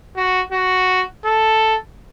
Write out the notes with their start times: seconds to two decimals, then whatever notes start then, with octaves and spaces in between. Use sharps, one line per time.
0.16 F#4
0.52 F#4
1.25 A4